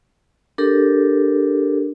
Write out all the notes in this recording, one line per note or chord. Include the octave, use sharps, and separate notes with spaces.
D4 G4 A4 A#4